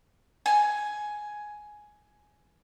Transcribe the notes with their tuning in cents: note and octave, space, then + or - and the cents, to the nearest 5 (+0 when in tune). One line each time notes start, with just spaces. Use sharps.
G#5 +10